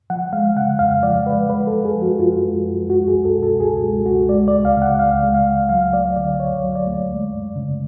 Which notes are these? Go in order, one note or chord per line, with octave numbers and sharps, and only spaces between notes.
F3 F#5
G#3 F5
C#3 F#5
F2 F5
F3 D5
G#3 B4
G#3 B4
A4
F#2
G#4
F3
F#4
F#2 F4
G#3
F#2
G#3 F#4
C#2 G#4
A4
B2
A4
C#2 G#4
G#3
C#2 F#4
G#3 D5
D5
C#2
F5
C#3
F#5
C#2 F5
G#3
F5
C#2
F#3 F5
A3 D5
D3 D5
D2 C#5
F#3
D5
A3
G#3
F#2
C#3